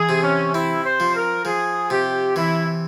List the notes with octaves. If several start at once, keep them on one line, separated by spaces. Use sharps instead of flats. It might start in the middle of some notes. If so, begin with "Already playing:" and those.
Already playing: E3 G#4
C3
C#4
C4 E4
C5
F3
A#4
F3 G#4
C3 G4
E3 E4